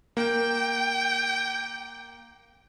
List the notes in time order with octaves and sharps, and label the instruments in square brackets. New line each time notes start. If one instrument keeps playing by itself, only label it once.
[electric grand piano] A#3 [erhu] G5